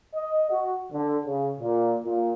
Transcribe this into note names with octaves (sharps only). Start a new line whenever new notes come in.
D#5
F#4
D3
C#3
A#2
A#2